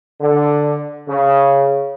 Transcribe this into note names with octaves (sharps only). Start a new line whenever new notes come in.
D3
C#3